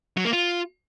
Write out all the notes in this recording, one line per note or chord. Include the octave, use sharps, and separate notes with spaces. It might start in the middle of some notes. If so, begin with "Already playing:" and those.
F#3
A#3
F4